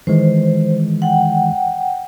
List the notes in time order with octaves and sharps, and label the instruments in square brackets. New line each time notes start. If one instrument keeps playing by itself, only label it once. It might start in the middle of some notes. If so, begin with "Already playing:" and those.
[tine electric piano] D#3 E3 G#3 [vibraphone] C5
[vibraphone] F#5 G5